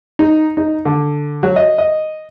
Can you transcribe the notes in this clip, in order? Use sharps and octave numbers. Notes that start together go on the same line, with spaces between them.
D#4
D#4
D3
F#3
D#5
D#5